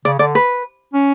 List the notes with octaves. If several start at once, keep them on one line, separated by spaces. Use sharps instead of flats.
C#3 D5
D3 D5
B4
C#4